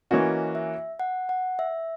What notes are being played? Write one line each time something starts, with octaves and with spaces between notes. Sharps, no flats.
E3 A#3 C#4 F#4 D#5
E5
F#5
F#5
E5